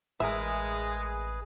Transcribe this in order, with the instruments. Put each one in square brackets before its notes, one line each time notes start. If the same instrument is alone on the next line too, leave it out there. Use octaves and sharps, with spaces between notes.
[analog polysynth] A1 [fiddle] G#3 [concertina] G#4 B4 G#5 [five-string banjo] A#4 E5